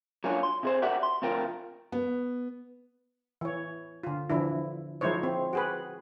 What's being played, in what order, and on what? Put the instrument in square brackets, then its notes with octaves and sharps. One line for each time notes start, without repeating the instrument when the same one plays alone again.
[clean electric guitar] F#3 A#3 C#4 D4 F4
C6
C3 G#4 C5
F#4 G4 A#4 D5 E5 F#5
C6
D2 C3 F3 F4 A#4 G5
[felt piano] B3
[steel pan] E3 C#5
D3 F4
D3 E3 F3 D4 E4
F3 G#3 D#4 E4 C5 C#5
C4
F#4 G#4 B4